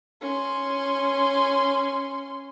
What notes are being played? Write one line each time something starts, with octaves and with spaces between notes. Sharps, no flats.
C#4 C6